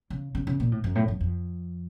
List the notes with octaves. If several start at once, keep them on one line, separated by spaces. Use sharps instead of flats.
C#3
C#3
C#3
A#2
A2
F#2
A2
F#2
F2